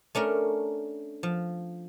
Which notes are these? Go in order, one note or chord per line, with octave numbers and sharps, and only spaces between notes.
A3 C#4 D4 A#4
F3